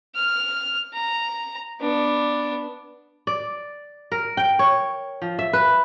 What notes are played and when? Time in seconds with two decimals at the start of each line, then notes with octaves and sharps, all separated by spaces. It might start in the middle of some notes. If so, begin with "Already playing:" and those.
0.16 F6
0.93 A#5
1.81 B3 D4
3.27 D5
4.12 A#4
4.37 G5
4.59 C#5
5.22 F3
5.39 E5
5.53 B4